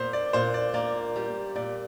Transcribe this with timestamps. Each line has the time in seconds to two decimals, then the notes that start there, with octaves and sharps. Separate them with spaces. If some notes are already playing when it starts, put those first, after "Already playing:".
Already playing: A#2 C5
0.13 D5
0.33 A#2 C5
0.54 D5
0.74 A#3 D5
1.16 G3
1.56 A#2 D5